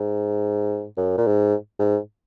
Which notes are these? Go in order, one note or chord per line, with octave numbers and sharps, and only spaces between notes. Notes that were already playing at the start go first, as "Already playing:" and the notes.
Already playing: G#2
F#2
A#2
G#2
G#2